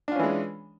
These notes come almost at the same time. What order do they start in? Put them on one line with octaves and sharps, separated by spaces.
D4 F4 C#4 E3 G#3